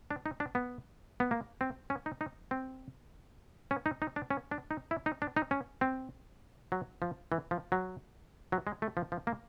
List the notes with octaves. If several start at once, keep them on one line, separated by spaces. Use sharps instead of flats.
D4
D#4
D4
B3
B3
A#3
C4
C#4
D#4
D#4
C4
C#4
D#4
D#4
D4
C#4
D4
D#4
E4
D#4
D4
D#4
C#4
C4
F#3
F3
E3
F3
F#3
F#3
G#3
A3
F3
F3
A#3